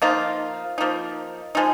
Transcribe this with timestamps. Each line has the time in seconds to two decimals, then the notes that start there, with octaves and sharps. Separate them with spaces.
0.02 F3 A#3 D#4 F4
0.78 F3 A#3 D#4
1.55 F3 G#3 D#4